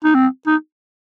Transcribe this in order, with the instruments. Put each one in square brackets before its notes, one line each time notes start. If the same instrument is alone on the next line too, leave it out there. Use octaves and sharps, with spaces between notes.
[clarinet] D#4
C4
D#4